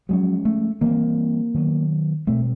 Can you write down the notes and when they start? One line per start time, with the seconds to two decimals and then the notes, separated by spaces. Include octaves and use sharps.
0.09 F3 F#3 G#3 C#4
0.45 A3
0.81 E3 G3 A#3 C4
1.54 D#3 F#3 B3
2.27 B2 G3 A3 C4